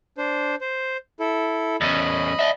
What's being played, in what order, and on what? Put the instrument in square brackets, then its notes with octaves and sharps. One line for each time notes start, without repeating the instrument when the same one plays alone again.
[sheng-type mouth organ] D4 C5
C5
E4 A4
[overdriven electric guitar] E2 C#4 [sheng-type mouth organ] D#5 B5
[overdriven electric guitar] D5 E5